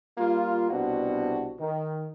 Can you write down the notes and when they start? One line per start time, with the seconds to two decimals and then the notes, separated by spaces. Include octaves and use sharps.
0.18 G3 A#3 F4
0.69 C2 B2 C4 D4 F#4
1.59 D#3